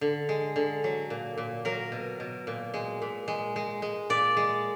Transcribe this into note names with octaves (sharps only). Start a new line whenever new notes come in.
D3
G#3
D3
F#3
A#2
A#2
F#3 A#4
B2
B2
A#2
G#3
A#2
G#3
G#3
G#3
A#2 D5
G#3